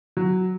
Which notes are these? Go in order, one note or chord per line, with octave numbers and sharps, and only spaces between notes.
F#3